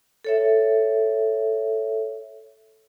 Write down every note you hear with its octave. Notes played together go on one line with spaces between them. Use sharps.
A4 C#5 E5